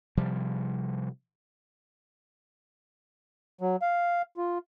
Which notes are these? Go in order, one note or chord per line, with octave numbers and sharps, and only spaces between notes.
C3 F3 G3
F#3
F5
F4